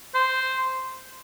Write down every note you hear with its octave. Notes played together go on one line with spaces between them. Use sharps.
C5